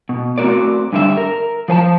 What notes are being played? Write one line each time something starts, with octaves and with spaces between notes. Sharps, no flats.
B2
A3 C4 F#4 A#4 D5
G2 D3 G3 E5
A#4
F3 C5 G#5 A5